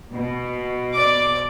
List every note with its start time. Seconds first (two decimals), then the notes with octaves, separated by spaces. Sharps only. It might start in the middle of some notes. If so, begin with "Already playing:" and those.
0.12 B2
0.93 D5 D6